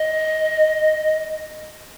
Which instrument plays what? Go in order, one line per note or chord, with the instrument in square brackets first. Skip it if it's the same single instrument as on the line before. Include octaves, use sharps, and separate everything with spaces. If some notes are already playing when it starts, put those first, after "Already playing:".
Already playing: [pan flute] D#5